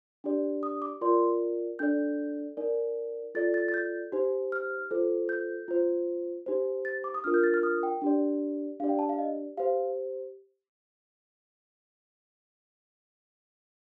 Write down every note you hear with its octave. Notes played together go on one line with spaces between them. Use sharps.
D4 G4 D5
D#6
D6
F4 A#4 D5 C6
D4 A4 D5 G6
D#4 A#4 D5
F4 A4 D5 A6
A6
A6
G6
D#4 G4 C5
F6
F4 A4 C5
G6
F4 C5
D#4 G4 C5
A6
D6
D#6
D4 F4 A#4 F6
G6
A6
F6
D#6
G5
D4 G4 D5
D4 G4 D5 F5
G5
A5
F5
D#5
G4 C5 F5